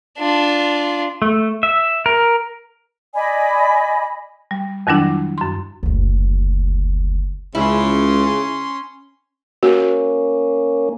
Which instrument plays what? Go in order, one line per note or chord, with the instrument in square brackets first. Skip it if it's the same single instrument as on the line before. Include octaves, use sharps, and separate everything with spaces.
[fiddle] D4 F4
[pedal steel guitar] A3
E5
A#4
[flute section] D5 D#5 G#5 B5
[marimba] G3
F2 D#3 F#3 G3 D4 E4
F#2 C6
[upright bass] F#1 D2
[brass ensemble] C#2 [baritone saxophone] C#3 [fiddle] C#4 C6 [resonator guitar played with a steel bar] E4
[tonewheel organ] A#3 C#4 [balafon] F#4